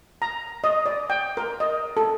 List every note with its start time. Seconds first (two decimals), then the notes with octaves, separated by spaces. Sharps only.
0.22 A#5
0.64 D#5
0.86 D5
1.10 G5
1.37 A#4
1.60 D#5
1.97 A4